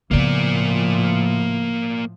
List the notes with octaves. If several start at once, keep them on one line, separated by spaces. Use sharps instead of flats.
A2 C#3 F3 A#3 B3 D5